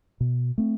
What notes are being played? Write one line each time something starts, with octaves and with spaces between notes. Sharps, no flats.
B2
A3 C4